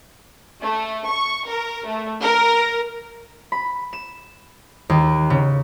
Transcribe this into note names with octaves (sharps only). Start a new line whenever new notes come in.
A3
C#6
A#4
A3
A#4
B5
E7
D#2
C#3